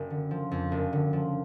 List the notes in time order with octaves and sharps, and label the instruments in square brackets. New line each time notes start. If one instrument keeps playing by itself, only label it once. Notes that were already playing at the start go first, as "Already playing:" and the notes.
Already playing: [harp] F#1
D3
F3
F2
F#1
D3
F3